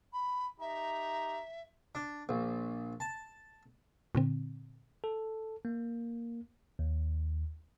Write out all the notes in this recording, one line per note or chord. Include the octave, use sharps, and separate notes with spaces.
B5
D#4 G4 E5 A#5
D4
A#1
A5
A#2 D3 C4
A4
A#3
D#2